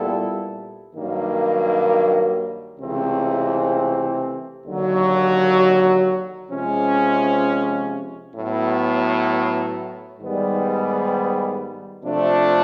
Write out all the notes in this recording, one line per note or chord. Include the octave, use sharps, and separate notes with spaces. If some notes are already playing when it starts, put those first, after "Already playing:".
Already playing: A#2 G3 B3 E4 A4
G2 D#3 F#3 A#3
C#2 C3 E3 A3 C4
D#2 D3 F#3
C3 F3 G#3 C#4
A2 F#3 B3
G#2 D#3 G3 B3
C3 F3 A3 D4